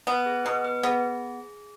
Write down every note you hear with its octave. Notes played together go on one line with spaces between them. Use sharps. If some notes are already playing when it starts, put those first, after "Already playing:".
B3 B4
G#4
B2 B4
B4
B3 G#4